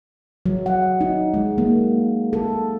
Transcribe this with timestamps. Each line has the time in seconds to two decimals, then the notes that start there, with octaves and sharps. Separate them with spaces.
0.46 F#3
0.66 F#5
1.01 D#4
1.34 G#3
1.58 A#3
2.33 A4